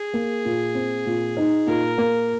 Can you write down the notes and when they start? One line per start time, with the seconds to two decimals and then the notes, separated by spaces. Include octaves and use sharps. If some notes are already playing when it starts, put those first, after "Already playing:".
Already playing: G#4
0.13 A#3
0.45 A#2
0.75 C4
1.06 A#2
1.37 D#4
1.67 A#2 A#4
1.98 A#3